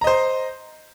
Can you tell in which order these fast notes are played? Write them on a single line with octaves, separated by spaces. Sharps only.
A#5 D#5 C5